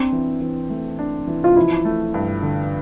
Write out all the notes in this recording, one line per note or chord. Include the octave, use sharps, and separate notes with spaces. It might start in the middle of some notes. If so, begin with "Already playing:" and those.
Already playing: C4 D4
E3
E3
A3
D4
E3
F4
F3 E4
A3
G2
D3